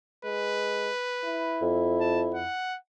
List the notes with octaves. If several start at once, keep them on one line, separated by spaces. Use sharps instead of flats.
G#3 B4
E4
F2
A5
F#5